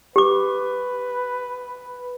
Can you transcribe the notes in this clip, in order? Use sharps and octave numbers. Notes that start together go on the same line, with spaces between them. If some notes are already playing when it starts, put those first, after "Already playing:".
G4 B4 D6